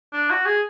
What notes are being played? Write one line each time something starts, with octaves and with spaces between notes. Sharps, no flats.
D4
F#4
G#4